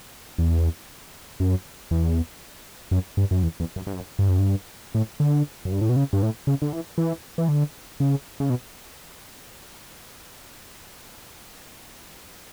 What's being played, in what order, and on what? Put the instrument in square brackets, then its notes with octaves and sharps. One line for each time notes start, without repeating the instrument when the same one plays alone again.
[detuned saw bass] E2
F#2
E2
F#2
G2
F#2
E2
E2
F#2
G2
F#2
G2
F#2
G2
A2
D3
F#2
G2
A2
B2
C#3
G2
A2
C#3
D3
E3
E3
E3
D3
C#3
C#3
B2